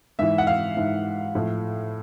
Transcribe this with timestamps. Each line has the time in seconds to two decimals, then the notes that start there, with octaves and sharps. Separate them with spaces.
0.19 G#2 E3 E5
0.38 F#5
0.47 F5
0.77 G#2 E3
1.35 A2 F3